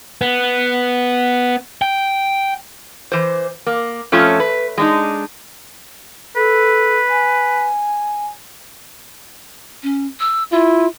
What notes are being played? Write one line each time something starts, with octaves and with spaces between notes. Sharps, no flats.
B3
G5
E3 C5
A#3
F2 A3 C#4 F4 C#5
B4
G#3 D4 D#4
A4 B4
G#5
C#4
E6
E4 F4